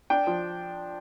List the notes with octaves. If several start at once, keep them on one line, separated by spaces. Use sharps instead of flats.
D4 G5
F3